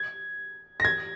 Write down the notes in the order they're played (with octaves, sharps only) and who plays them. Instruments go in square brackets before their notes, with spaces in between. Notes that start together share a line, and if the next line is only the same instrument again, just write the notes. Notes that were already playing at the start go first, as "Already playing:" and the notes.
Already playing: [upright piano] G#6
A#6
G#6